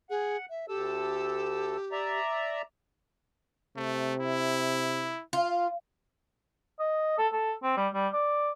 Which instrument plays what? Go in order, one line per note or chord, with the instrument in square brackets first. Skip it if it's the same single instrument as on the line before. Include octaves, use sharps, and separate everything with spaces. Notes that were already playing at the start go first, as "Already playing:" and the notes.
[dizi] G#4 [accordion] F#5
[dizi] E5
[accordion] D2 A4 E6 [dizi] G4
[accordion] D5 E5 A#5
[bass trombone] C3 [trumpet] A3
[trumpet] E4
[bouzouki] F4
[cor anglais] D#5
A4
A4
C4
G3
G3
D5